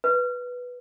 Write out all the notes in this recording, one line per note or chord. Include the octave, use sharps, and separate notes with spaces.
B4